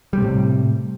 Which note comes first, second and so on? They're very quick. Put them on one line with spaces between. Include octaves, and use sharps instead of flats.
G3 C3 A2